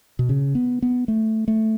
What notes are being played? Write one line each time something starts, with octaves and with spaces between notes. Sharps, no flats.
B2
C#3
B3
B3
A3
A3